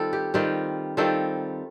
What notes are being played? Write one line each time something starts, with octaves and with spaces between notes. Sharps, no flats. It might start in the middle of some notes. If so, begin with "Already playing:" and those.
Already playing: D#3 G3 C4 F4 A4
G4
D#3 G3 C4 F4
D#3 G3 C4 F4 A4